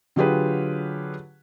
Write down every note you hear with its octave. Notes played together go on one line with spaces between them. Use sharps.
D3 F#3 F4 G4 G#4 B4